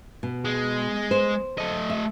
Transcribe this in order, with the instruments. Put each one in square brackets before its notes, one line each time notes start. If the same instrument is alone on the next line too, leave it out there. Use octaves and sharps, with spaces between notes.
[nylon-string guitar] B2
[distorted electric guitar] G#3
[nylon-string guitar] C5
[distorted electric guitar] A3 D#5
[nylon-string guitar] E5